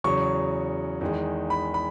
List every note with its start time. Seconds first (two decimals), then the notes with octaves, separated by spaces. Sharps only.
0.04 E2 C#3 F#3 C#6
1.01 E2 D#3 G#3
1.50 B5
1.74 B5